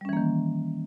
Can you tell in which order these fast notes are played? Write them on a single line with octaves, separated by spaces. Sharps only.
G3 C#4 E3 A#3 D#3